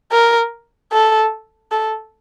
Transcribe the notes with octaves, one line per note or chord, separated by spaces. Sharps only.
A#4
A4
A4